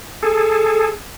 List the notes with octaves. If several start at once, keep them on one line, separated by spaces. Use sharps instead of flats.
G#4 A4